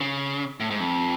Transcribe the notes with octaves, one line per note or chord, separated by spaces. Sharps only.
C#3
A2
G#2
F2